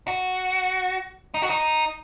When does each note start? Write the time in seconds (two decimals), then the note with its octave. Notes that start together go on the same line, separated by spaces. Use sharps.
0.08 F#4
1.34 D#4
1.42 F#4
1.50 D#4